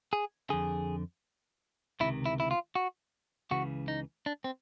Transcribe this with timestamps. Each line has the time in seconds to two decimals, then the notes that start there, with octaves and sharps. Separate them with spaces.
0.13 G#4
0.50 F2 D3 G#4
2.00 C#2 C3 D#3 E4
2.26 E4
2.40 E4
2.51 F4
2.75 F#4
3.51 C#2 C#3 E3 F#4
3.88 D#4
4.26 D4
4.44 C4